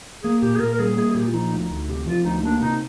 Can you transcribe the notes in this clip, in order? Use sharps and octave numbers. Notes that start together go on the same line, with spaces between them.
A#3 G#4
A#2 G4
G#4
A#2 A#4
A#4
G3 G#4
A#3 G#4
G#4
A#2 G4
F4
F3 D#4
D2
D#4
D2
C3 G4
F3 F4
D2 D#4
A#3 D4
C3 D#4